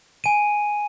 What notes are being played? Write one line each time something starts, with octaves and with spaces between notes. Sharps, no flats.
G#5 D#7